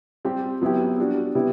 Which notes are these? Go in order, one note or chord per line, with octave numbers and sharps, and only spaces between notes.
G3 C4 G4
F#3 B3 E4 G4
G3 D4 F#4
C3 G3 B3 E4 G4